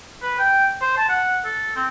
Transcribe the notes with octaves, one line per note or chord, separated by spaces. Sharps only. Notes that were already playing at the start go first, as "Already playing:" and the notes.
B4
G5
C5
A5
F#5
A4
C4